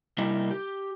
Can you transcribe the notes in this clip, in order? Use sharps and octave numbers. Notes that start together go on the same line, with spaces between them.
C3 G3 A#3 D#4 E4
G4